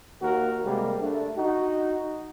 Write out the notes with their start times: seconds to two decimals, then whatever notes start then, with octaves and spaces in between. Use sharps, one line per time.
0.22 D#2 A#3 F#4 A#4
0.65 C3 G3 G#3 A#3
1.00 A3 D4
1.37 D#4 F#4